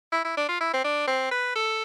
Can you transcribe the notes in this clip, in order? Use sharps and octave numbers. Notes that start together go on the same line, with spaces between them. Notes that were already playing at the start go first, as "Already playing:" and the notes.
E4
E4
D4
F4
E4
C4
D4
C4
B4
A4